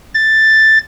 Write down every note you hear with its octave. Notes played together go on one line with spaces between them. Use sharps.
A6